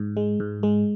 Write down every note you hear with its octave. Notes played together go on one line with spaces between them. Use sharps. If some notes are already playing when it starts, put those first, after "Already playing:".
Already playing: G#2
G#3
G#2
G#3